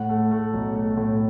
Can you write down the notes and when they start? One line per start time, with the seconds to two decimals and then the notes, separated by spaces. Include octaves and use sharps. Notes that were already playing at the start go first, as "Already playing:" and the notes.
Already playing: A2 F#5
0.09 A3
0.31 A3
0.53 B1
0.75 A3
0.97 A2